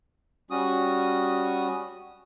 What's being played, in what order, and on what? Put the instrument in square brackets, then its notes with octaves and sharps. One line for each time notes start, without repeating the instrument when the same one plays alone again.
[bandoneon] G3 C#4 F#4 D#6